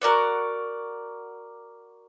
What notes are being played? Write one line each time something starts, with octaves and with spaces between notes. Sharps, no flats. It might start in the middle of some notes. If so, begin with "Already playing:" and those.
F#4 A#4 D5 F#5